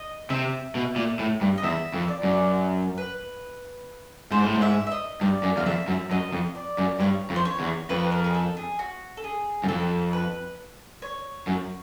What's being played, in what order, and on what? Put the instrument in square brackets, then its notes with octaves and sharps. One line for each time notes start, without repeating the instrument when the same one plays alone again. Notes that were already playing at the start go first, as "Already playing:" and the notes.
Already playing: [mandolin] D#5
[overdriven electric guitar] C3 [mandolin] E5
[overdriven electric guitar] B2
A#2
A2
G2
[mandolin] D#5
[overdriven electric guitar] E2 [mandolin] E5
[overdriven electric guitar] F2
[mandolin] D5
[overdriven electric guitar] F#2
[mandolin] B4
[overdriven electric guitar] G#2 [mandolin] C5
[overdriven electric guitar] A2
G#2
[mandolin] E5
E5
D#5
[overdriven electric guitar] G2 [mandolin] D5
[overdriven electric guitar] F#2
[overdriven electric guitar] E2 [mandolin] F5
[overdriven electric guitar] F2 [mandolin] E5
[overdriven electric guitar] F#2
[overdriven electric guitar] F#2 [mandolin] D#5
[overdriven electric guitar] F2
[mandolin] D5
[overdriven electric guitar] F#2
[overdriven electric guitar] G2 [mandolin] C#5
[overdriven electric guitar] F2
[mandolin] C5
C#5
[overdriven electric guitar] E2
[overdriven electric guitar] F2 [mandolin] B4
[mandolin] A#4
G#4
A4
G#4
F#4
A4
G#4
[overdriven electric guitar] F#2
[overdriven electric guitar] F2 [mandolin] A4
[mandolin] B4
C#5
[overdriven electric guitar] F#2